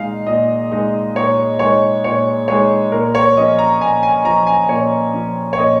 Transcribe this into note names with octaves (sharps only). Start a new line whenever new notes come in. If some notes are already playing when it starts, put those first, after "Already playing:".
Already playing: A#2 G#3 D#4 D#5 F5
A#2 D#5
G#3 D#4 D#5
A#2 C#5
G#3 D#4 C#5
A#2 C#5
G#3 D#4 C#5
A#2 A#4
C#5
F3 C#4 D#5
A#5
A#2 G#5
G#5
F3 C#4 A#5
G#5
A#2 C#5
F3 C#4
C#5
A#2 D#5